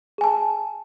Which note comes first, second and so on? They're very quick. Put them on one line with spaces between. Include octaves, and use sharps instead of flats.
G#4 G#5 A5